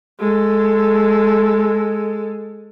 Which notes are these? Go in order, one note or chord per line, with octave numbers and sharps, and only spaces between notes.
G#3 A4